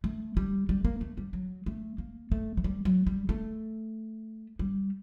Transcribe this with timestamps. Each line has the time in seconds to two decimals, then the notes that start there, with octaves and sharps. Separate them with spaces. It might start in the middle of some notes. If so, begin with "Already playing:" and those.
0.04 A3
0.37 G3
0.69 G3
0.85 A#3
1.01 A3
1.17 G3
1.33 F#3
1.66 A3
1.98 A#3
2.32 A3
2.57 F#3
2.64 G3
2.85 F#3
3.07 G3
3.29 A3
4.59 G3